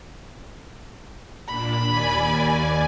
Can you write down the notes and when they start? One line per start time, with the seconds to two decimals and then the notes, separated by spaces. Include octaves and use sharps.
1.48 A#2 D4 B5
1.85 D#2 D5 G#5